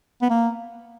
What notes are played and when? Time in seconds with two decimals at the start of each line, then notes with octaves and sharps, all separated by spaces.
0.22 B3
0.30 A#3